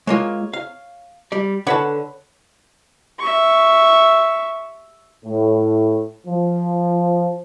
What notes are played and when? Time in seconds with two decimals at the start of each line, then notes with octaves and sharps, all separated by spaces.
0.07 G#3 A#3 F4 C#5
0.53 F5
1.32 G3 D5
1.67 D3 B4 C#5 F#5 A5 B5
3.19 E5 C#6
5.25 A2
6.27 F3